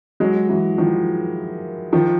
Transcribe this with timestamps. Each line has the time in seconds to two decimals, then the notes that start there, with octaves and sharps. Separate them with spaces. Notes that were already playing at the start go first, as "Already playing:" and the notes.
0.20 F#3 G#3
0.49 E3 F#3
0.78 D#3 F3
1.93 D#3 F3